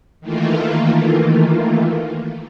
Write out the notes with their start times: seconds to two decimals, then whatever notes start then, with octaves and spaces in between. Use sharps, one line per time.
0.21 D#3 E3 A3 A#3 F4